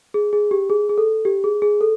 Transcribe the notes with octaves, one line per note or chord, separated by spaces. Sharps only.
G#4
G#4
G4
G#4
G#4
A4
G4
G#4
G#4
A4